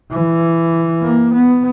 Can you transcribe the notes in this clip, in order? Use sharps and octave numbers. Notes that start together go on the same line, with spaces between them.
E3
A#3
B3